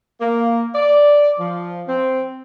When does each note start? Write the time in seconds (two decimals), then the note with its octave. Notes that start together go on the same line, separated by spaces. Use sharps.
0.20 A#3
0.75 D5
1.39 F3
1.87 C4